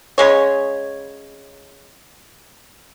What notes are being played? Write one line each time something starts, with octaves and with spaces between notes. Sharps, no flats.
C#3 G#3 C#5